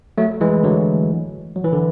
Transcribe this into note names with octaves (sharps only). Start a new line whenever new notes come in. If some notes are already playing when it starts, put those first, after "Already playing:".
F#3 A3
E3 G#3
D3 F#3
F#3
E3
D3